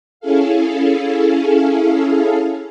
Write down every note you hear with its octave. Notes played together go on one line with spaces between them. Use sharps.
C#4 E4 G#4 A4 F5